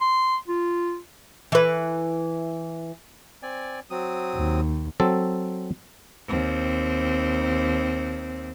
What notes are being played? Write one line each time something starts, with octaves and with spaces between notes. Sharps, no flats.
C6
F4
E3 B4
C4 D5 G#5
F#3 C4 D#6
D#2
F#3 C4 A4
D#2 C4